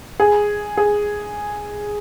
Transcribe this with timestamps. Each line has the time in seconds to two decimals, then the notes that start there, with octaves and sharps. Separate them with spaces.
0.20 G#4
0.77 G#4